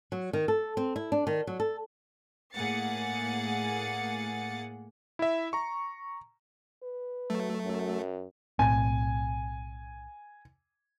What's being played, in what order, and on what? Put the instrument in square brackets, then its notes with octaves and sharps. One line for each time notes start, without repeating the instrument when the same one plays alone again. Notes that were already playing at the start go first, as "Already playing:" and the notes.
[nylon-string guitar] F#3
D#3
A4
C4
E4
D4
D#3
F#3
A4
[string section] A2 A#3 G#4 F#5 A6 C#7
[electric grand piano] E4 E5
A#5 C#6
[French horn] B4
[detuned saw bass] F#3 [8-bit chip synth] A3
[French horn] F#2
[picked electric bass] B1 A2 C4 [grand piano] G#5